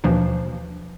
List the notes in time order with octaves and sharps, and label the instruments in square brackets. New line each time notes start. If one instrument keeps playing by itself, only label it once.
[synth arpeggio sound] D#2 B2 E3 F3 A#3 D4